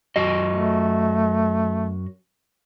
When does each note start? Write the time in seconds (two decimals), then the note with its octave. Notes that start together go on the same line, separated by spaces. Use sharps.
0.16 F#2 F#4 D#5
0.50 A3